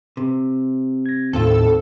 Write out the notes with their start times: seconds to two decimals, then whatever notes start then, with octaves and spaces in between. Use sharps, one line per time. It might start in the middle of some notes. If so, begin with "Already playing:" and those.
0.17 C3
1.06 G#6 A#6
1.33 D#2 A2 D#3 C4 F4 A4